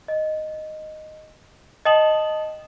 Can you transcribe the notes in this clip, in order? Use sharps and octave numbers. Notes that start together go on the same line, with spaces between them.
D#5
D#5 G5 A5 D#6 E7 F#7